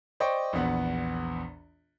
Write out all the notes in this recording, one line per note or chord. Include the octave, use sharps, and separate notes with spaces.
C5 D5 D#5 G5 C#6
A#1 E2 B3 F#5